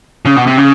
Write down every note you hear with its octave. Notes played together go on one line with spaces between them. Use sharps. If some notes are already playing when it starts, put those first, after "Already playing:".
C#3
B2
C3
C#3